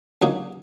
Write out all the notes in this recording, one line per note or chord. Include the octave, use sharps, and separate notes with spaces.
C#2 C#3 F#3 A#3 D#4 F#4